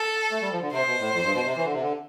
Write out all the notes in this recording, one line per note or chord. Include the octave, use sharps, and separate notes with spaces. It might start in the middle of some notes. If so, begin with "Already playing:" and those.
Already playing: A4
A3
G3
F3
D3
C3 C5
B2
A2
F2
G2
B2
C3
E3
D3
C3
D3